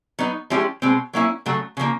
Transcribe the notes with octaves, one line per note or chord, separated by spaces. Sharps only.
F#3 B3 D#4
F3 G#3 C#4 E4 G4
B2 G#3 C4
F#3 A#3 C#4 E4
C#3 F#3 A3
C#3 F3 A#3